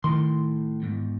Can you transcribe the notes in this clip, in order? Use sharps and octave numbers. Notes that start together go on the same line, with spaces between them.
A2 D#3 C6
E2 G#2